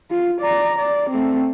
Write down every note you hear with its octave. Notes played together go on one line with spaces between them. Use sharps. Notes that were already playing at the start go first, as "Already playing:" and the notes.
F4
D5 A#5
D5
A3 C4